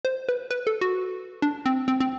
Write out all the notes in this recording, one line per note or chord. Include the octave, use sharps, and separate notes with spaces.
C5
B4
B4
A4
F#4
D4
C4
C4
C4